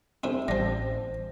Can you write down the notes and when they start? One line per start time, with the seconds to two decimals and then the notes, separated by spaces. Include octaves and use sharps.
0.24 F2 C3 E4
0.48 A1 F3 G3 C5 A#6